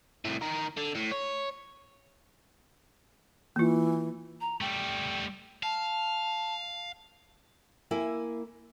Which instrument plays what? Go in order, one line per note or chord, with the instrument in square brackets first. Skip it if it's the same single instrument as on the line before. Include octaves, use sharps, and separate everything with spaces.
[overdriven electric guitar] C2 A2
D#3 A#4
D3
A2
C#5
[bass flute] E3 [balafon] A#3 F4
[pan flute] A#5
[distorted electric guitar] G3 A3 [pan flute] G5
[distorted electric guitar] F5 [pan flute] A5
[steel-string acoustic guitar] A#3 E4 G#5